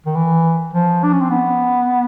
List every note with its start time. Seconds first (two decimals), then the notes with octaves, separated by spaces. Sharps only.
0.06 D#3
0.15 E3
0.73 F3
1.03 D4
1.13 C#4
1.21 C4
1.31 B3